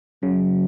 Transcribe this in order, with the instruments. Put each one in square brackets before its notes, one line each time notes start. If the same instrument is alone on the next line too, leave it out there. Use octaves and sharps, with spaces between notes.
[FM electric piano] C#3 [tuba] F#3